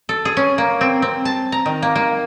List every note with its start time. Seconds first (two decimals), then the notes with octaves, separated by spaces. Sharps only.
0.09 A4
0.25 G#4
0.37 C#4
0.58 A#3
0.81 C4
1.02 C4
1.25 A5
1.52 A#5
1.66 D#3
1.82 A#3
1.95 A#3